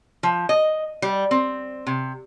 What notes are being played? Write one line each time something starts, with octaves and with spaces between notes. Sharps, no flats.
F3
D#5
G3
C4
C3